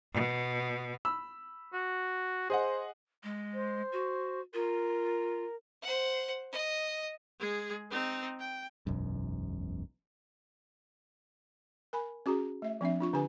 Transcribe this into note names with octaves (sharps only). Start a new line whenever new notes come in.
B2
B5 E6
F#4
G#4 C5 D#5 F#5
G#3
C5
F#4
F4 A#4
C5 F#5
D#5
G#3 G#4
C4 D#4
G5
E1 B1 F#2
A#4 G#5 B5
C#4 F#4 G#4 A#5
A3 E5
F3 C4 D4 E5
D4 F4 C#6
D3 D4 G4 B4 G#5